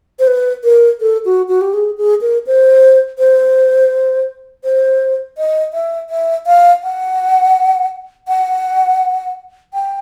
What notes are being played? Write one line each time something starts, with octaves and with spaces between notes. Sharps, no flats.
C5
B4
A#4
A4
F#4
F#4
G4
G#4
G#4
A#4
C5
C5
C5
D#5
E5
E5
F5
F#5
F#5
G5